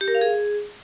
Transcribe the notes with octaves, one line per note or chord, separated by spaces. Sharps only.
G4
A#4
F5
G#4